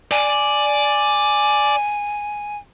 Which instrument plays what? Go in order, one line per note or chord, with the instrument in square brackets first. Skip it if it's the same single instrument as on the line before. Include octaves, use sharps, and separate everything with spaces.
[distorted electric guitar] D5 [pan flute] G#5